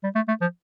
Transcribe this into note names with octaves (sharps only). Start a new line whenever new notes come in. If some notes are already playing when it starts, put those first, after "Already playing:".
G3
A3
A3
F3